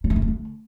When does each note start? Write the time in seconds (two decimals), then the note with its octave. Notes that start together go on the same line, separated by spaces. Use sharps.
0.04 F#3
0.10 A3
0.16 C#3
0.22 A3
0.28 D3